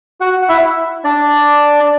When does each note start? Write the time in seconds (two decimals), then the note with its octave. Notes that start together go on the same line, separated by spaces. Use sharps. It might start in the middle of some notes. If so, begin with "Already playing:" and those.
0.21 F#4 F#5
0.42 F#5
0.49 E4 E5
1.04 D4 D5